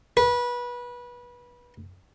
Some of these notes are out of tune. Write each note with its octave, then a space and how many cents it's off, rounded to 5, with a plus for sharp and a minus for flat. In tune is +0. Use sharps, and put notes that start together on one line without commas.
B4 -25